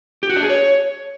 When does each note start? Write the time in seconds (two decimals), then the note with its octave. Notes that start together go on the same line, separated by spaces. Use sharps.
0.23 G4
0.29 F#4
0.36 D4
0.43 G#4
0.50 C#5